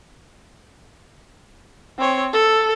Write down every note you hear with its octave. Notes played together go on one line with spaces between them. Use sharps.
C4 C#5
A4